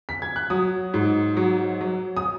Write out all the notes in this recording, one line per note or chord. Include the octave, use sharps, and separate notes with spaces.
B6
G#6
F#6
F#3 D#6
G#2
F#3
F#3
D#6